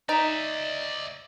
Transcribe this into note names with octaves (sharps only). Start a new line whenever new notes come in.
D#4 D5 E5